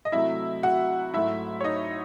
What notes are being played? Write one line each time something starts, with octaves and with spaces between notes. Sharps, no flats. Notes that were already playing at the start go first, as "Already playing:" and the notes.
D#5
C3 F#3 A3 E4 E5
F#4 F#5
G#2 F#3 A3 E4 E5
C#5
D#4 D#5